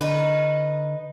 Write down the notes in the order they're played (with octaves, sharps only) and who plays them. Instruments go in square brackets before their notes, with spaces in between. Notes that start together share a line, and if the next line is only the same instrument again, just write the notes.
[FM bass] D3 [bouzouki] D#4 B4